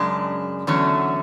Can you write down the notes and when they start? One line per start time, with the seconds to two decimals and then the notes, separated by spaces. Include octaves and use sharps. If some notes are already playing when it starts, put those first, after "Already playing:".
Already playing: F#2 C#3 G#3 D4
0.67 E2 D3 F#3 A3 C#4